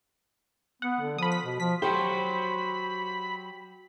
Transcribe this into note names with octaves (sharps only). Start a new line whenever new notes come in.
B3 F#5
D3
F3 B5 D#6
B6
B2
F3 B6
F#3 F#4 G4 C5 B5